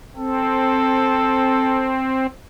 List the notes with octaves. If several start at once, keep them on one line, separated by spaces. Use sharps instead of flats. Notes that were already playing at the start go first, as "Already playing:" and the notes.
C4 A4